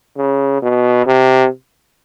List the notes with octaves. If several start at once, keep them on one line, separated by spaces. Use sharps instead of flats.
C#3
B2
C3